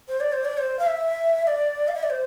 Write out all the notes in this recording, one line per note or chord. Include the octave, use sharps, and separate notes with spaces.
C5
D5
C5
D5
C5
F5
E5
D5
F5
E5
D5
C5